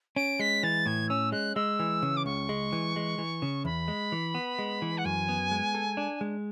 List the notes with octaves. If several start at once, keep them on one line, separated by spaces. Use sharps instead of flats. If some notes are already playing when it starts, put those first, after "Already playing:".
C#4 D7
G#3 B6
E3 A6
A2 G#6
C#4 E6
G#3 F#6
G#3 E6
E3
C#3
D6
C#2 C#6
G#3
E3
G#3
E3
C#3
E2 B5
G#3
E3
B3
G#3
E3
F#5
F#2 G#5
B3
G#3
A4
D4
G#3